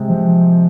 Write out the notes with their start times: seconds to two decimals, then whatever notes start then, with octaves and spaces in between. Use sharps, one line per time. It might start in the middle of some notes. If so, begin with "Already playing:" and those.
Already playing: C3 G#3 C4
0.09 F3